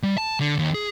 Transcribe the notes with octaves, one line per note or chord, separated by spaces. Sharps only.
G3
A5
D3
D#2
G#4